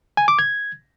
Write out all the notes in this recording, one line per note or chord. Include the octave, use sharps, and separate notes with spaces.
G#5
D6
G#6